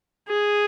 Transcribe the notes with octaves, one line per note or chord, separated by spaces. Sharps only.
G#4